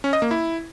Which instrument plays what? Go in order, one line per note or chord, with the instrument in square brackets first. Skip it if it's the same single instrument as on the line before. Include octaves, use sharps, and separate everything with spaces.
[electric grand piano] C#4
D#5
A#3
E4